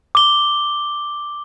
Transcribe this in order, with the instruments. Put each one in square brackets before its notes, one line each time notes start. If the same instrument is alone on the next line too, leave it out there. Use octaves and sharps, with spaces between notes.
[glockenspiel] D6 G7